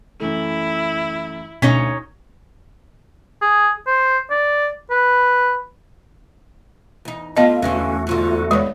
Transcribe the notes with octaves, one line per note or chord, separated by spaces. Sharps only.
F#2 E3 A3 E4
D2 B2 C#4 D#4 C#5 B6
G#4
C5
D5
B4
E2 D#4
A2 B3 F4 D#5 F5
E2 D3 E3 G#3 A3 C#4 F#4 E5
D2 G#2 D3 F4
D#2 G#3 B3 C#5 D5